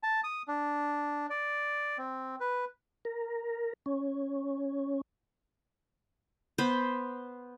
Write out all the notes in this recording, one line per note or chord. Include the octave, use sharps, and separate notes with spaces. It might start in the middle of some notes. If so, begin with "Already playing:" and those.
A5
D#6
D4
D5
C4
B4
A#4
C#4
B3 C5 B5